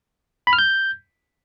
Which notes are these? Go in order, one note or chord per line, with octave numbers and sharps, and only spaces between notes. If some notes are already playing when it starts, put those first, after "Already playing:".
B5
F6
G6